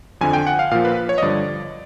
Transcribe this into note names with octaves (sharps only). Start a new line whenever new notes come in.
F2 D3 F3 G#5
G5
F#5
F5
A#2 F3 F5
B4
C#5
D#5
G2 D3 F3 D5